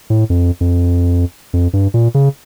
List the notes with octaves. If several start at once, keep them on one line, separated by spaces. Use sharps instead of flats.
A2
F2
F2
F2
G2
A#2
C#3